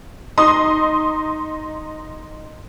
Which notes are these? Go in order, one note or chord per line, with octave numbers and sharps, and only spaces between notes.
D#4 C6 D#6